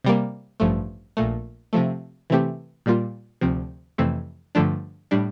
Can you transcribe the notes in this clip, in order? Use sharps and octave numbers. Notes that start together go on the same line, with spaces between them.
C3 G3 A#3
A1 G2 F3 A3
A#1 A#2 A3
C3 F3 A3
C3 E3 A3 C4 G4
A#2 G3 A#3 F4
D2 C3 F3 C4
F2 C3 E3 A3 C4
G2 D3 F3 A3 D4
A2 G3 D4